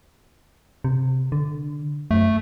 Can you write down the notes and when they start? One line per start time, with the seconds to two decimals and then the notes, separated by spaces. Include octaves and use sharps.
0.85 C3
1.32 D3
2.11 F#2 A3